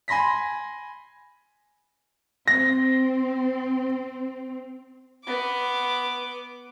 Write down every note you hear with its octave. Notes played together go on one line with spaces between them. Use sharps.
G#5 B5 C6 A#6 B6
C4 A#6
B3 D6